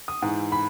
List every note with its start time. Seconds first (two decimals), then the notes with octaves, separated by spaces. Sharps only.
0.08 D#6
0.22 G#2 E3
0.52 B5